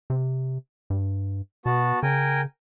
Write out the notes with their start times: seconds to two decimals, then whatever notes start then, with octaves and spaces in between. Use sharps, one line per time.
0.10 C3
0.90 G2
1.66 B2 B3 F#4 A5
2.03 C#3 A#4 G5 G#5